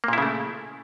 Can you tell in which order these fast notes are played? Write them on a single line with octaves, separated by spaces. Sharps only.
A#3 A#2 E4 C#3 A3